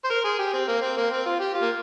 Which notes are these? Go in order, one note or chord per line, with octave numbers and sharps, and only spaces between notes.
C5
A#4
G#4
G4
C4
A#3
C4
A#3
C4
F4
G4
F4
A#3